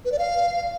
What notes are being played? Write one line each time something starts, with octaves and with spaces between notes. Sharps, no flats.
B4
D5
F5